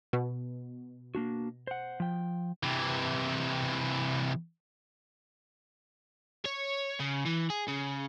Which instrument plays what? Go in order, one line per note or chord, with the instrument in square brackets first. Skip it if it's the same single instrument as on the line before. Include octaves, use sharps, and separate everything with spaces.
[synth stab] B2
[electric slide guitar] A#3 D4 F#4
C5 F#5
F3 G5
[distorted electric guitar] C3 E3
[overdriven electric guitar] C#5
C#3
E3
G#4
C#3